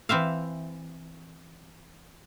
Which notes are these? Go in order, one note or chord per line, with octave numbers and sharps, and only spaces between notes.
E3 C4 E5 F5